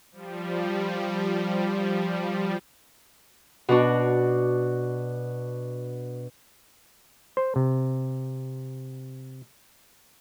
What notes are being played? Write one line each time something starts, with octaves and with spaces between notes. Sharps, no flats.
F3 G3
B2 D4 F#4
C5
C3